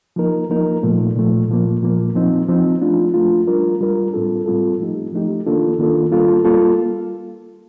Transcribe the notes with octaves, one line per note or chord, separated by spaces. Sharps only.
F3 A#3 D#4 A#4
F3 A#3 D#4 A#4
A#2 F3 A3
A#2 F3 A3
A#2 F3 A#3
A#2 F3 A#3
F3 C4 D#4
F3 C4 D#4
F3 A3 D4 F4
F3 A3 D4 F4
G3 D4 F4 A#4
G3 D4 F4 A#4
A2 G3 C4 F4 A4
A2 G3 C4 F4 A4
F3 A3 D#4 G4
F3 A3 D#4 G4
D#3 A#3 D4 F4 A4
D#3 A#3 D4 F4 A4
G3 A#3 F4 A4
G3 A#3 F4 A4